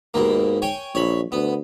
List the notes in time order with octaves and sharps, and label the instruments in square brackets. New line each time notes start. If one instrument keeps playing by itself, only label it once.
[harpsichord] D#2 B2 A#3 [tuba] G#2
[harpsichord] C#5 G5 G#5
[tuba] A#1 [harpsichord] C#5 B5
[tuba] D2 [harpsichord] B3